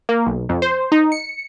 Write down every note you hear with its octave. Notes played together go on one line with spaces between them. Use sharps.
A#3
B1
F2
C5
D#4
C#7